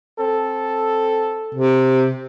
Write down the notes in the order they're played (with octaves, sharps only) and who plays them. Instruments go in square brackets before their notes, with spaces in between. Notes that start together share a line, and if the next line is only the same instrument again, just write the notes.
[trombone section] C4 A4
[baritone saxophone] C3